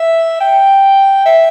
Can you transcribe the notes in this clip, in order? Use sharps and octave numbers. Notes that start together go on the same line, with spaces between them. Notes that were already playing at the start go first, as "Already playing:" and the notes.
Already playing: E5
G5
E5